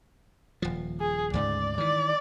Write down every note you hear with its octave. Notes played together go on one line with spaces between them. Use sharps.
D#1 F3
G#4
D2 G#2 C#3 D5
D#3 E3 D5